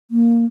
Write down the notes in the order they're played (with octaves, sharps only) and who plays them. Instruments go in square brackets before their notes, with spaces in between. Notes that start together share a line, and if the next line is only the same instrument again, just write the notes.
[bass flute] A#3